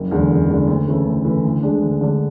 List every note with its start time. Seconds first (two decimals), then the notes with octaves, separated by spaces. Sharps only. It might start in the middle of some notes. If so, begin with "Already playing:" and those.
Already playing: F#1
0.11 E2 D3 G#3
0.30 F#1
0.49 E2 D3 G#3
0.67 D2
0.87 C#3 E3 A3
1.06 D2
1.25 C#3 E3 A3
1.44 D2
1.63 D3 G#3 D4
1.82 D2
2.01 D3 G#3 D4